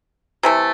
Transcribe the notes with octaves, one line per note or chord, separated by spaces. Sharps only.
C3 E3 A3